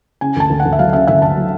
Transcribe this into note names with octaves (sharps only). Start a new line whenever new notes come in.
C#3 G#5
D2 A5
D2
F#5
D2
E5
F#3 F5
C#3 E5
D2 E5
D2 A5
F#3